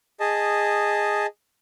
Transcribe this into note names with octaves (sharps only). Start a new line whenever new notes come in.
G#4 D#5 A5